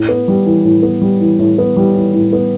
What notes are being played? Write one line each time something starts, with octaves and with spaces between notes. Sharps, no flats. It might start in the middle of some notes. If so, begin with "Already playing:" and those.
Already playing: A2
B3
G3
E3
A2
B3
G3
E3
A2
B3
G3
E3
A2
B3